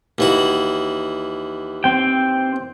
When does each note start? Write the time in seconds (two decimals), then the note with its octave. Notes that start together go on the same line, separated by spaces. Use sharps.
0.18 D#2 E3 F#4
1.84 C4 G5